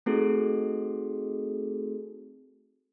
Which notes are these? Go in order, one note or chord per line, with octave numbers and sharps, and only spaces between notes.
A3 C4 D#4 F#4 G#4 A4